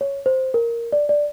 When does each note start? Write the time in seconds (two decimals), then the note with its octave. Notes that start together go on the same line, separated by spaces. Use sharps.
0.01 C#5
0.26 C5
0.54 A#4
0.92 D5
1.09 D5